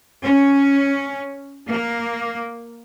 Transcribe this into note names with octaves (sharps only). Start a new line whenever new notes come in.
C#4
A#3